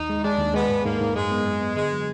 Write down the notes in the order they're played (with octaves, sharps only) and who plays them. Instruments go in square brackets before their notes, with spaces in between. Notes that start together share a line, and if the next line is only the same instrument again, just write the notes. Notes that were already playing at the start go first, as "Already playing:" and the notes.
Already playing: [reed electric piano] D#2 [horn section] D#4
[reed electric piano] G#3
[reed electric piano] G#3 [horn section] D4
[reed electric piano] D#2
[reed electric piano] G#3 [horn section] B3
[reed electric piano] G#2
[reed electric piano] G#2 [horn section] A#3
[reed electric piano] G#2
[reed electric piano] F#2 [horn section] G#3
[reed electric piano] B3
F#2
B3
[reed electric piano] D3 [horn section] G#3
[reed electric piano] F#3